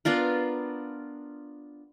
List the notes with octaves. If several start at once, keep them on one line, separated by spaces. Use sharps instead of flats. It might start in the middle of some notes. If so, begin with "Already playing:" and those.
B3 D4 F4 A#4